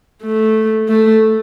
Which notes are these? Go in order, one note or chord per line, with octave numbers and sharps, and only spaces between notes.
A3
A3